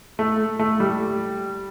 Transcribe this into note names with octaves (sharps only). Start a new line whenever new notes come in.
A3
A3
G3